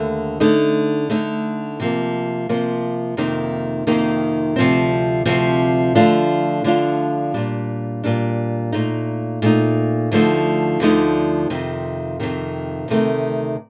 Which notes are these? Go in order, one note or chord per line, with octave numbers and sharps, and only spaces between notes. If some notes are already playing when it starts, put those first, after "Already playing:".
Already playing: D#2 D3 A3
D3 A3 D#4
D3 A3 D#4
C3 F3 A#3
C3 F3 A#3
F2 C3 D#3 A#3 D#4
F2 C3 D#3 A#3 D#4
D2 C3 F3 C4
D2 C3 F3 C4
D3 F3 A3 D4 F4
D3 F3 A3 D4 F4
A#2 G3 D4
A#2 G3 D4
A#2 A3 D#4
A#2 A3 D#4
D2 D3 F3 A3 D#4
D2 D3 F3 A3 D#4
F2 C3 D#3
F2 C3 D#3
D2 C3 D#3 A3